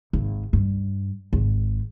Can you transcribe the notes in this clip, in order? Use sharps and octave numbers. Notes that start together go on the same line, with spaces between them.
G#1
G2
G#1